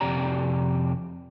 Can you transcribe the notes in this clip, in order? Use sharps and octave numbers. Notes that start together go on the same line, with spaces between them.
F2 C3 G4 D5 A#5